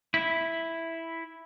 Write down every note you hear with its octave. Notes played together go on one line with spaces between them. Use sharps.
E4